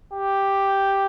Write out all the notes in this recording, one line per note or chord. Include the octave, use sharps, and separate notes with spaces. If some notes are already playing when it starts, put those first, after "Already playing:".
G4